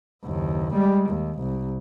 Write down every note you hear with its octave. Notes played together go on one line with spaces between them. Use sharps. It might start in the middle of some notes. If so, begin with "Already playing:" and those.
F#1 D#2
G3 G#3
D#2
C2